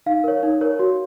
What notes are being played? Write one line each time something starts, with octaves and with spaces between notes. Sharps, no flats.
D#4 F5
A#4 C#5
D#4
A#4 C#5
F#4